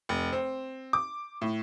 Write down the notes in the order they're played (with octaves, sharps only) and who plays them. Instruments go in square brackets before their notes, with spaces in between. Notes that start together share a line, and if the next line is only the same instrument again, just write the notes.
[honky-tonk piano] F1
C4
D6
A2